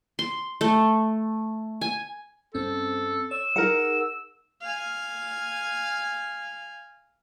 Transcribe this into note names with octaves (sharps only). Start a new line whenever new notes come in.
C6
A3
G#5
G2 C4 C#4 A4
C#5 E6
D#4 G#4 A#4 F#5
F5 G#5